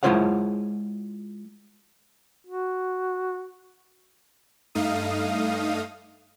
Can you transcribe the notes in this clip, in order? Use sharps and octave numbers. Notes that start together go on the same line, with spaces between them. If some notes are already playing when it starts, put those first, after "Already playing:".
G#3 E4 F4 C5 C#5 F#5
F#4
G2 A3 D#4 F5 D#6